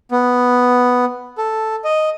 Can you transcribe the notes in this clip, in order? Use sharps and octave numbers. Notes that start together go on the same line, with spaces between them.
B3
A4
D#5